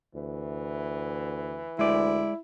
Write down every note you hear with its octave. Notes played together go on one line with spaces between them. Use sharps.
D2 E3
D2 G#3 E4 D5